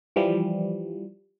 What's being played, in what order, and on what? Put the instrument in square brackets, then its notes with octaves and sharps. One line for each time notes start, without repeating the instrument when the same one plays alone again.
[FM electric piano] E3 F3 G3